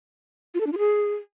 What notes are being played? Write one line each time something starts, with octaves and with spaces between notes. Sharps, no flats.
F4
A4
D4
F4
G#4